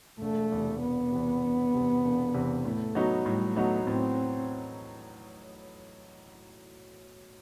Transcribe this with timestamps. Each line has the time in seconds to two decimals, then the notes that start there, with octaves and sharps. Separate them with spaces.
0.21 E1 A3
0.52 E2 C3
0.82 E1 B3
1.12 E2 C3
1.43 E1
1.74 E2 C3
2.04 E1
2.34 E2 C3
2.64 A2 A3
2.95 F#3 B3 D#4 F#4
3.25 A2 G3
3.56 F#3 A3 B3 D#4 F#4
3.86 A2 C4